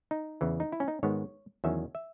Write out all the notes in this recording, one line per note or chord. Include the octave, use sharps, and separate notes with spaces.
D#4
E2 C#3 E3
D#4
E4
C#4
D#4
G#2 D#3 G#3 B3 C#5
E2 D#3 F#3 C#4 E5
E5